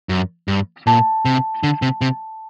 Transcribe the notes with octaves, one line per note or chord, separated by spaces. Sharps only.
F#2
G2
A#2 A5
C3
D3
C3
C3